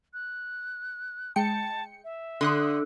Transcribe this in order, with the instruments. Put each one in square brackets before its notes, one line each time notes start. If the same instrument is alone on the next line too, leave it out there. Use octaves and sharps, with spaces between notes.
[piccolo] F#6
[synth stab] G#3 G5 C#7 [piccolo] A5
[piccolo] E5
[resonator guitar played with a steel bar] D3 [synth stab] C6 D#6 F#6